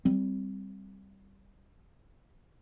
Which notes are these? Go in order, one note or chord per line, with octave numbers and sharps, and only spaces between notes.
G3 C4